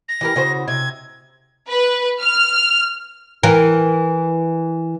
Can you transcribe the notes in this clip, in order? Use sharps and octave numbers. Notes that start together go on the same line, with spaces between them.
A#6
E3 G4 A#4
C#3 F#4 C5
C3 G#6
B4
F6
E3 A#4